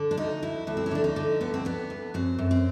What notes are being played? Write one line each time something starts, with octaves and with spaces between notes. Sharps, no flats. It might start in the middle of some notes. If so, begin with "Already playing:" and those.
Already playing: D3
D4
D2 D#4
D2 E4
D2 E4
C4
C#4
D3 D4
D#4
D3
D2 B3
C4
D2 B3
D2
F#2 C4
F#2
C4